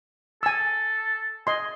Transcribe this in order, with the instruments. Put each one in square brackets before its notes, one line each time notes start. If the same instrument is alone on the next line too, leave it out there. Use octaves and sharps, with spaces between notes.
[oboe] A4 [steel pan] G#5 E6
[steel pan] D#5 C6 [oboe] G#5